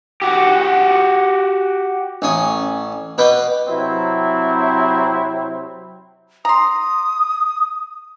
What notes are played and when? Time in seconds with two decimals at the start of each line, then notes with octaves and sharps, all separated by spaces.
0.22 F#4 G4
2.22 A1 C#4 D#6
3.18 B2 B4 G5 D6
3.68 C3 F#3 C4 E4
6.45 A#5 C6 D#6